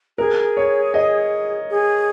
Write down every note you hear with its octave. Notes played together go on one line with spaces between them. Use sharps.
G#4 A#4
C#5
D#5
G#4